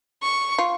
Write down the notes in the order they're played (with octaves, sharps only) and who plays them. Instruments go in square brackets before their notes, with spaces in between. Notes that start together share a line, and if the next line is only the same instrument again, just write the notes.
[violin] C#6
[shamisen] F4